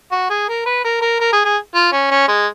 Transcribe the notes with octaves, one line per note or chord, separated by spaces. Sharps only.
F#4
G#4
A#4
B4
A#4
A#4
A#4
G#4
G#4
F4
C#4
C#4
G#3